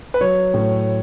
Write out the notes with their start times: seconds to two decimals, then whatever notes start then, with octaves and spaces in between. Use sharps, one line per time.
0.14 B4
0.21 F#3 C#5
0.54 A2